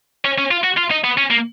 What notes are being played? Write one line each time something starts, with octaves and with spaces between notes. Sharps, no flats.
C#4
C#4
F4
F#4
F4
D#4
B3
C#4
A#3